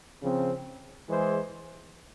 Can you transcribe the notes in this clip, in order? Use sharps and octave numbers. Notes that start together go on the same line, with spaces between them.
C#3 F3 C4
E3 G#3 E4 G#4 C5